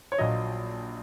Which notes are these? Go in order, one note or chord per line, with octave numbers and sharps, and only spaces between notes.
C#5
A#1 A#2 F#3 D#5